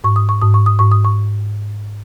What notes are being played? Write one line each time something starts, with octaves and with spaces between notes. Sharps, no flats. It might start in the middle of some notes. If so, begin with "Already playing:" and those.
G#2 C#6
D#6
C#6
G#2 D#6
C#6
D#6
G#2 C#6
D#6
C#6